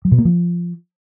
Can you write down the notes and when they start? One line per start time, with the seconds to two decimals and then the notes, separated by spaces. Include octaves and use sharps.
0.05 F#3
0.12 B2
0.18 A#3
0.25 F3